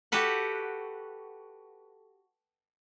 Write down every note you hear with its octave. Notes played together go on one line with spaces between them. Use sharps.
F#4 G4 A4 B4 F#5